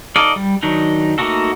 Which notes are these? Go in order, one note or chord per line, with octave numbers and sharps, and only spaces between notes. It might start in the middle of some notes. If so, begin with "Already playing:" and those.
D#4 A4 D5 D#5 F5
G3
D#3 F#3 D4 D#4
A3 A#3 D#4 F#4 A4